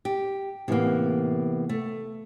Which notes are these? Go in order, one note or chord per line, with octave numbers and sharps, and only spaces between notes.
G4
A2 C3 E3 A#3 B3
A3